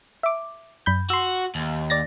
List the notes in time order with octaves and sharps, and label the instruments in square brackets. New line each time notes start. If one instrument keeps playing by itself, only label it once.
[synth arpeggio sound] E5 D6
F#2 B5 G6
[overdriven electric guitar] F#4 [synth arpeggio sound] C6 E6
[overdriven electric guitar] D#2
[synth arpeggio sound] D5 A6 A#6